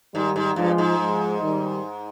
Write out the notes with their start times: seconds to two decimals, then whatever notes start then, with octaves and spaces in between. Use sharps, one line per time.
0.14 G#2 D#3 G3
0.36 G#2
0.56 G2 F3 G#3
0.78 G#2
0.99 F3 G#3
1.42 D#3 G3